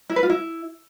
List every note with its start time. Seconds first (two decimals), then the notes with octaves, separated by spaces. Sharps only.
0.10 E4
0.16 B4
0.23 F4
0.29 E4